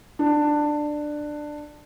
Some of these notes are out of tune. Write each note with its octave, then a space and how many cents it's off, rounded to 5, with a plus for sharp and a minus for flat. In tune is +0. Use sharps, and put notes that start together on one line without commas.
D4 +15